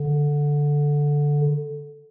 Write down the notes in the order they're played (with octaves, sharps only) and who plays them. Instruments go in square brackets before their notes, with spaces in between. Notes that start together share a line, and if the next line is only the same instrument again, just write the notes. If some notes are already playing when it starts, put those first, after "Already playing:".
Already playing: [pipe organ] D3